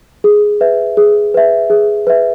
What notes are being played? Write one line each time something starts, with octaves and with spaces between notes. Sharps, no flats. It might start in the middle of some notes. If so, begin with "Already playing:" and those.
G#4
B4 E5
G#4
B4 E5
G#4
B4 E5